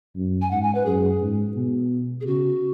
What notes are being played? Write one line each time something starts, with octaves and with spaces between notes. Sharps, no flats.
F#2
G#5
G#2 F#5
G#5
B4
F#2 G#4
G#2
B2
G#4
C#3 F#4